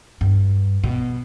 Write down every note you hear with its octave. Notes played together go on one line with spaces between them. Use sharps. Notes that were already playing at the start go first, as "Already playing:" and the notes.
G2
B2